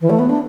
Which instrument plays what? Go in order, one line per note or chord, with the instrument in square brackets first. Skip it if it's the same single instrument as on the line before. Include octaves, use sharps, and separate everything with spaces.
[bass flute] E3
A3
B3
D4